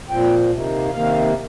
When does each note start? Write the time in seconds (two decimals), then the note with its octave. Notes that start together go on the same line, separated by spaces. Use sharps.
0.10 A#2 F3 C4 G5
0.51 C3 D#3 A#3
0.93 C3 D#3 A#3 F5